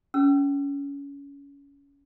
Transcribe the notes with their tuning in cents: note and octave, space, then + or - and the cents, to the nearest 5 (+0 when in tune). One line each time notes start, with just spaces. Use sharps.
C#4 +25 E6 +40